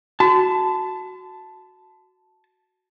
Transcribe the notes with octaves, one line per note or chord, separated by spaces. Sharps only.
F#4 A5